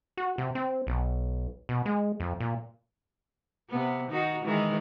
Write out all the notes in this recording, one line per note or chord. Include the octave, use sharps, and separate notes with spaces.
F#4
C3
C4
B1
B2
G#3
F2
A#2
C3 B3
D#3 D#4 F#4
D#3 E3 G#3